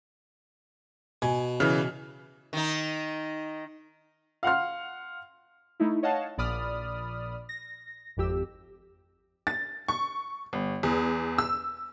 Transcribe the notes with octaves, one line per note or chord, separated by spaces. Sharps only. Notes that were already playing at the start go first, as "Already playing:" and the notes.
B2 G#5
C#3 E3 F6
D#3 D#4
F5 F#5 C6 F6
A3 D#4 E4
C#5 D#5 F5 F#5 A5
A#1 A#2 D5 B5 D#6 F6
A#6
G#1 F2 G4 E6
A6
C#6
G1
E2
E6